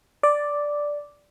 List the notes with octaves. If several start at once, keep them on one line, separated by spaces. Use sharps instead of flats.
D5